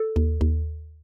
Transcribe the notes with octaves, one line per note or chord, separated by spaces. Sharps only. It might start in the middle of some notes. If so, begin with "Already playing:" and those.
Already playing: A4
D#2
D#2